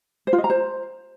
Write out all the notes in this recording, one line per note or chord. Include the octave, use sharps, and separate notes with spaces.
C5
F4
D#5
A#5
C5